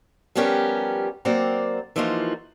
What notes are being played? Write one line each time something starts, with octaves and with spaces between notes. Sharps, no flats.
F3 G3 B3 C#4 G4 A#4
F#3 A#3 C4 D5 F#5 A#5
E3 F3 A#3 D#4 F4 F#4